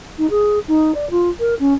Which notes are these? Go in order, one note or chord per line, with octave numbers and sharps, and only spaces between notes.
D#4
G#4
D#4
D5
F4
A#4
C#4